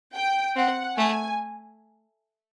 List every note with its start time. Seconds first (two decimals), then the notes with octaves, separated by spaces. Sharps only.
0.14 G5
0.56 C4 F#5
0.98 A3 G#5